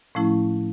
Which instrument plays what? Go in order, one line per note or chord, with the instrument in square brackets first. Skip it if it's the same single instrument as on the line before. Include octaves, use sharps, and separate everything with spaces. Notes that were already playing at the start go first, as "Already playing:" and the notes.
[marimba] A2 F3 A3 C#4 E4